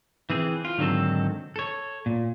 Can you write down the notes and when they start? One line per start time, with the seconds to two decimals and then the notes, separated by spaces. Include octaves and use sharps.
0.30 E3 C4 G#4
0.65 F4
0.78 G#2 D3 D#3 F#3 C4 A4
1.56 A4 C#5
2.06 A#2